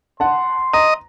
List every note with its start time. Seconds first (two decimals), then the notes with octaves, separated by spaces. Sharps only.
0.20 F#5 A5 C6
0.74 D#5 A#5